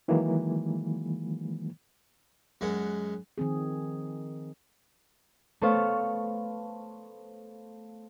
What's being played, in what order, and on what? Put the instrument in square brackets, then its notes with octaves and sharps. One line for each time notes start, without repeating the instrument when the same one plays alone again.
[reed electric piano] D#3 E3 F#3 G#3 A#3
[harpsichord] F#2 G#3 F#5
[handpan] D#3 F3 C4 G#4
[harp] A3 B3 A4 C5 C#5 F5